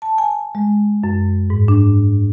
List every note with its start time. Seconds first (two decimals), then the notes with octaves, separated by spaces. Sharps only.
0.02 A5
0.18 G#5
0.55 G#3
1.04 F#2
1.50 G#2
1.68 D4